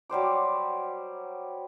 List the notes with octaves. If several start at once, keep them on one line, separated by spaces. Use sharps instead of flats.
F#3 G3 C5 D6